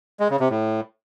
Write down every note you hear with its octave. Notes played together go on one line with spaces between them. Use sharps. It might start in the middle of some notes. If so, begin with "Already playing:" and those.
G#3
C#3
C3
A2